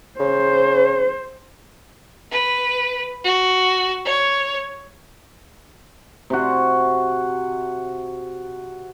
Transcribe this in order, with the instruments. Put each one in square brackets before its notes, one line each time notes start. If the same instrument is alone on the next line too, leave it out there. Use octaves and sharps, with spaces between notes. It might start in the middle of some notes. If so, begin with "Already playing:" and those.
[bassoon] C#3 [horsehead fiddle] C5
[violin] B4
F#4
C#5
[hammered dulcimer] C3 F#4